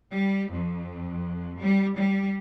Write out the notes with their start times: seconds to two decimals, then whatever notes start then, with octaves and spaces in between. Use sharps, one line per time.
0.13 G3
0.52 F2
1.59 G3
1.97 G3